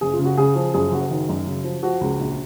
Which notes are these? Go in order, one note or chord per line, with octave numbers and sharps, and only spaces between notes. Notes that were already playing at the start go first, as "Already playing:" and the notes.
F#1 G#4
F4
C#3
F#4
C#3 G#4
F3
F#2 G#4
F#1 F#4
D#3
F#2
C#3
F3
F3 F#4
C#2
A#1